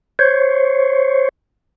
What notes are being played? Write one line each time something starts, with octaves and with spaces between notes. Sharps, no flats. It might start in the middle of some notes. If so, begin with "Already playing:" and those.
C5 C#5